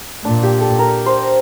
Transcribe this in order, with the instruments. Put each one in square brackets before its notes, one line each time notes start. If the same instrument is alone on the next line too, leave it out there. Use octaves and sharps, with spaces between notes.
[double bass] A#2 [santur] D4
[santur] G4
A4
A#4
C5